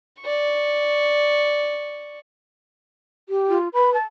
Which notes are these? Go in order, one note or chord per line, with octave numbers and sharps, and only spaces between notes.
D5 C#6
G4
F4
B4 B5
A5